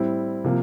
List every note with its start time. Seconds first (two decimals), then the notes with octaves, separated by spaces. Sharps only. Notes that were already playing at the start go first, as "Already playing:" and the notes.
Already playing: A2 G3 C4 E4
0.44 C3 F3 A#3